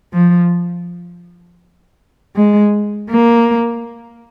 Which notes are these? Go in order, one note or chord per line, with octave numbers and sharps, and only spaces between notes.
F3
G#3
A#3